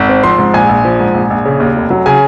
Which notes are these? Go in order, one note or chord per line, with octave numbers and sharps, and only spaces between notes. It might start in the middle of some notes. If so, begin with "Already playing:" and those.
Already playing: G#1
C4
F3 C6
G#2
A#1 G#5
A#1
F3
G#2
A#1
A#1
C#3
D#2
F1
F#3
C#3 G#5